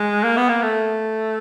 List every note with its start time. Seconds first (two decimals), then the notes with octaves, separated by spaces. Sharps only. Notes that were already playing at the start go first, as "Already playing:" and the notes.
Already playing: G#3
0.23 A#3
0.37 B3
0.49 A#3
0.62 A3